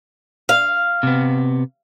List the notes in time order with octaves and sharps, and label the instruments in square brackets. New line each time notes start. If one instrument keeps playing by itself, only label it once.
[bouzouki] F5
[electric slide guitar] C3 B3